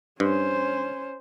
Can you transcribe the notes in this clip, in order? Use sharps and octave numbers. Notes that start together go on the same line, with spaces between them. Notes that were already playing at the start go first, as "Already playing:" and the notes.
G2 C#4 C5